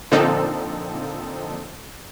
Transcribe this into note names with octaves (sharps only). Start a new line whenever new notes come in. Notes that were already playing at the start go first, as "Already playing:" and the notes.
A#2 D3 F3 C4 D#4 A4